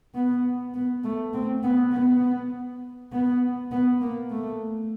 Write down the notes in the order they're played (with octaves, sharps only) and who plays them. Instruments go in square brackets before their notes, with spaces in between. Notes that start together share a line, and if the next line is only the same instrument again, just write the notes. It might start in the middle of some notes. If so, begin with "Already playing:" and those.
[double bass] B3
B3
A3
C4
B3
B3
B3
B3
A#3
A3